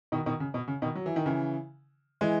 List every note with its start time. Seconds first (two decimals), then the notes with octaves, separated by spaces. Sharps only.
0.12 B2 D#3
0.26 B2 D#3
0.40 C#3
0.54 B2
0.68 C#3
0.82 B2 D#3
0.95 F#3
1.06 E3
1.16 D#3
1.26 C#3 E3
2.21 E3 G#3